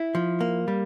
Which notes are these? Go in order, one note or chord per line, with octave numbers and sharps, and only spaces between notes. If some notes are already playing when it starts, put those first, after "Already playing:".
Already playing: E4
F3
A#3
G3